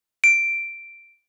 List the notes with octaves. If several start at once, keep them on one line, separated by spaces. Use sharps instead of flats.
D7